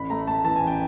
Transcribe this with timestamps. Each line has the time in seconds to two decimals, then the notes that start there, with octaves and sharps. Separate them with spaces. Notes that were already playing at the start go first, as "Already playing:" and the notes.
Already playing: A1 B5
0.10 A3 A#5
0.27 A3 A5
0.45 E3 A5
0.56 G#5
0.62 A1
0.67 G5